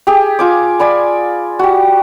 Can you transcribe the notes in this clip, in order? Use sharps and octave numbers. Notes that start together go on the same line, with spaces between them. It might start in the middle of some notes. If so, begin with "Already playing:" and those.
G4 G#4
F4 G#5 D6
D5 G#5 B5
F#4 G4